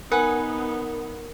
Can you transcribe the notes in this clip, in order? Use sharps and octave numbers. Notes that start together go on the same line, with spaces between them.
B3 D#4 A#4 B4 F#5 G#5